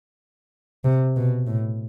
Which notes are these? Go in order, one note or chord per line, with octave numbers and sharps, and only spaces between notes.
C3
B2
A2